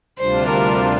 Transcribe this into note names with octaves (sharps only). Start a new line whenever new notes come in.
D2 C3 G3 D4 F4 C5
A#4